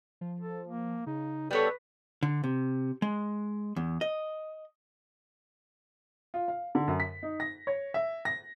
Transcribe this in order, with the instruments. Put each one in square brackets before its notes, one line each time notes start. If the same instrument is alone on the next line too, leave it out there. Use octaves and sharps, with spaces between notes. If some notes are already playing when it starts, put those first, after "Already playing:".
[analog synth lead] F3
[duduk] A4
A#3
[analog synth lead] C#3 [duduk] D#4
[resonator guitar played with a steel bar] G3 B3 C#5 [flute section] A4 [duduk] B4
[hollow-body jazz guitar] D3
C3
G#3
E2
D#5
[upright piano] F4
F5
D3
F#2
B6
D#4
A#6
C#5
E5
A#6